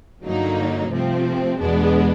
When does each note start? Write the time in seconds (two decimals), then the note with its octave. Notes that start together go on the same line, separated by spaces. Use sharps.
0.24 G2 D3 F#3 A#3 D#4
0.91 C3 F3 A3 C4
1.59 E2 B2 G#3 B3 D4